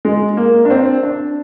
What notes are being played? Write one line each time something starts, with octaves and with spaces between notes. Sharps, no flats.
G#3
A#3
D4
C4
D4